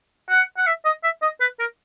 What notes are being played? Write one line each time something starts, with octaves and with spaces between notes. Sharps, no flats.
F#5
F#5
E5
D#5
E5
D#5
B4
A#4